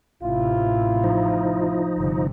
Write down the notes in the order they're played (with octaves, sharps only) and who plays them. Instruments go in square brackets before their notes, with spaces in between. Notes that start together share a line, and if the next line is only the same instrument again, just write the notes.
[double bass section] A1 C3 [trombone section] E4 F4
[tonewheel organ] F3 D#4
[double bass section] G1 C3